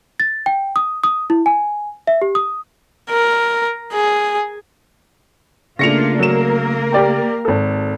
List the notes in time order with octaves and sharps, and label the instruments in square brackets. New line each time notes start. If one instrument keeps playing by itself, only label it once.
[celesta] A6
G5
D#6
D#6
E4
G#5
E5
G4
D#6
[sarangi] A#4
G#4
[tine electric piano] C#3 A3 [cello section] A#3 D4 F4 [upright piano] A#6 C#7 F7
[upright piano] F#3 E7 [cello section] A#3 A#4
[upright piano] G4 D5 G5
G#1 A4